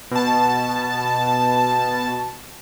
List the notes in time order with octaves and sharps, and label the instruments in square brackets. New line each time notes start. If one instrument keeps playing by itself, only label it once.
[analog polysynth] B2 A5